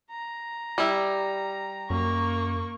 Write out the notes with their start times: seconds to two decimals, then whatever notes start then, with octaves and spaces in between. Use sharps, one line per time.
0.11 A#5
0.78 G3 E4
1.90 F#2 A#3 C#6